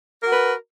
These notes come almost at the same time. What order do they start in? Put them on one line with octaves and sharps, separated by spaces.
A#4 F#4 B4